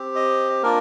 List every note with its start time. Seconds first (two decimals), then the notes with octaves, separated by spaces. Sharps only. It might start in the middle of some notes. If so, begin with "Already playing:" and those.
Already playing: C4 G4
0.15 D#5
0.63 A#3 D4 F4 A#4